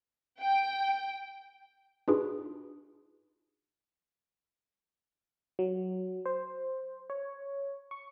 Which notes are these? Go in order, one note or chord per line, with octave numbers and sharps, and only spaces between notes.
G5
D4 D#4 F4 F#4 G#4 B4
F#3
C5
C#5
C#6